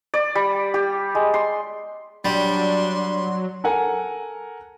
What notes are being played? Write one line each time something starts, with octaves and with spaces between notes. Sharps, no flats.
D5
G3
G4
G#3
C6
F#3 G3 D4 C6
A4 A#4 F#5 G#5